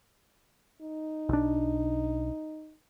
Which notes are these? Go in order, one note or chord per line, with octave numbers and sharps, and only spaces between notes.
D#4
B1 D4